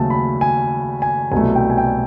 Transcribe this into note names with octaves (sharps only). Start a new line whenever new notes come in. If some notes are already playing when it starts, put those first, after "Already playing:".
Already playing: D#2 C#3 F#3 A3 A5
B5
G#5
G#5
C2 B2 F#3 A3 G#5
G5
G#5
G5